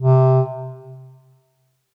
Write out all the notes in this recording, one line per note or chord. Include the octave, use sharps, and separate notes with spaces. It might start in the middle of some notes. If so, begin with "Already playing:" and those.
C3